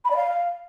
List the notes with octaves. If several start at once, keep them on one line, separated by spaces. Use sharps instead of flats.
B5
D5
F5